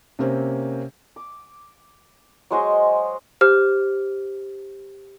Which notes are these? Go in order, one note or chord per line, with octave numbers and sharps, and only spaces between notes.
C3 A#3 C4 C#4
D6
F#3 G#3 C5 D#5
G4 C5 F6